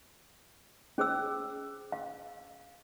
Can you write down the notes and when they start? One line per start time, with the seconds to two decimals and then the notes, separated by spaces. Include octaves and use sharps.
0.98 C#4 G#4 C5 E6
1.92 F5